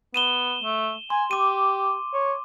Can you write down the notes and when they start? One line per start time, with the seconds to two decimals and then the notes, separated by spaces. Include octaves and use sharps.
0.14 B3 D#7 E7 G7
0.63 A3
1.10 G#5 C6
1.31 G4 D6 D#7
2.13 C#5